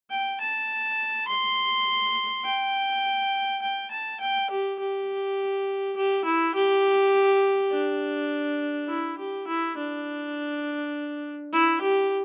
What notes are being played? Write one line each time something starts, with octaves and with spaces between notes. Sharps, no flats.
G5
A5
C6
G5
G5
A5
G5
G4
G4
G4
E4
G4
D4
E4
G4
E4
D4
E4
G4